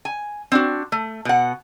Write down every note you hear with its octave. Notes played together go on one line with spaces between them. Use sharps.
G#5
C4 D4 F#4
A3
B2 F#5